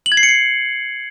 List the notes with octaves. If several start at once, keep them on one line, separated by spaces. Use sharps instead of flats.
F#7
G#6
C7
C#7
C7